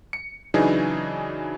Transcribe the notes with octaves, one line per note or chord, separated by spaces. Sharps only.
C#7
C#3 E3 F#3 D4 D#4 G#4